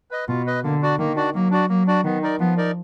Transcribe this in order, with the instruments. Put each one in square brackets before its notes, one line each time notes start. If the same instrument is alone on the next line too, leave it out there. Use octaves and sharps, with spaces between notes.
[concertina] B4 D#5
[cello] B2 [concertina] F4
[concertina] B4 D#5
[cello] D3 [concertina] A#3
[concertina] D4 F#4 D5
[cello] D#3 [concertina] A#3
[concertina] D4 F#4 D5
[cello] F#3 [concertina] A#3
[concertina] D4 F#4 D5
[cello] F#3 [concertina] A#3
[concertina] D4 F#4 D5
[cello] D#3 [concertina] B3
[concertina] D#4 A#4 D5
[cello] F3 [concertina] B3
[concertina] D#4 A#4 D5